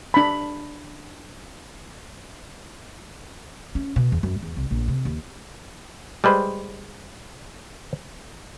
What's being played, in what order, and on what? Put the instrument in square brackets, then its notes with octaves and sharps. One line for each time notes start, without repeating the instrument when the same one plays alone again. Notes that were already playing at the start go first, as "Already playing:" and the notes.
[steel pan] D4 B5
[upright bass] C#4
B2
E2
F#2
E2
C2
A#1
C3
D#2
[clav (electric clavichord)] G3 G#3 B4 C5